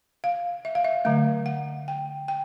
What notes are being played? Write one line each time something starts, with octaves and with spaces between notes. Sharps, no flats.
F5
E5
F5
E5
D3 F#3 A3 F5
F#5
G5
G5